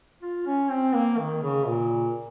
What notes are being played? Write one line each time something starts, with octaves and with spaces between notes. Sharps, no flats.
F4
C#4
C4
A#3
D#3
C#3
A#2